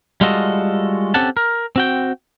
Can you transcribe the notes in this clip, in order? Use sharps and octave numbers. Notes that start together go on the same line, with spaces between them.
G3 G#3 F4 F#4 A4 D#5
C4 C#4 G4 A4 F#5 A5
A#4
C4 F#4 G5